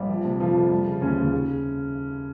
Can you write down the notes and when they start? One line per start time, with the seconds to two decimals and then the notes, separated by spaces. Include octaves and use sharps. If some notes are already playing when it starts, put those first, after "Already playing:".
Already playing: A#1 G3 G4
0.09 F3
0.25 C3
0.40 F2 F3 F4
0.55 F2
0.71 G3
0.87 C#3
1.02 D#2 C#3 C#4
1.18 D#2
1.33 C#3